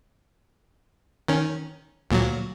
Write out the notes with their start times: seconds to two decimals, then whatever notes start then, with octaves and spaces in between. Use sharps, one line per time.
1.28 D#3 C#4
2.11 D2 A#2 F#3